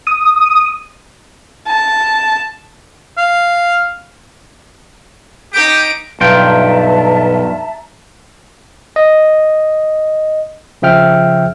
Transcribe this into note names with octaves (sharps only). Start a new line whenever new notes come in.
D#6
A5
F5
D#4 G4 G6 D7
B1 G2 F4 B4 E5 G5 A5 A#5
D#5
C#3 F3 E5 G5 F6